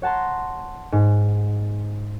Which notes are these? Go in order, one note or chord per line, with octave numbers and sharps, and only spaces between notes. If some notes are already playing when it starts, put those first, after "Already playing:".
C#5 F#5 A5 A#5 C6
G#2